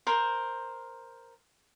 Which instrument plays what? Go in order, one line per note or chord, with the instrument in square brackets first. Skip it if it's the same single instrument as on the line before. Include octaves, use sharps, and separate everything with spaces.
[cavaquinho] A#4 C5